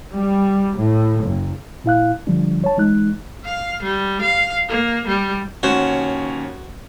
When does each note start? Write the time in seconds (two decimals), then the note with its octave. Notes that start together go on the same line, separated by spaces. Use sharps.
0.13 G3
0.77 A2
1.22 F#1
1.84 A#2 E4 F5 F#6
2.27 D3 F3 G3 D4
2.64 C#5 A5
2.77 E3 G#3 D#4 F#6
3.45 F5
3.83 G3
4.22 F5
4.69 A#3
5.08 G3
5.63 D#2 C#4 F#4 C5 C#5